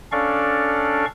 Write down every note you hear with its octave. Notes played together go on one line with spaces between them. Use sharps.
C#4 D4 A4 D5 F5 C#6